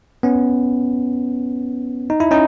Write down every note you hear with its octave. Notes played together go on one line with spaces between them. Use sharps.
B3 C#4
D#4
E4
C#4 D#4